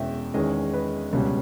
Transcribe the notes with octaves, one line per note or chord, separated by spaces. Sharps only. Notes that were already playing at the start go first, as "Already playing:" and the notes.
Already playing: E2 B2 G#3 C#4 E5 G5
E2 D#3 G#3 C#4 D#5
B4
C#2 B2 G3 C#4